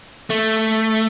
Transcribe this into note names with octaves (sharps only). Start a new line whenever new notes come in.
A3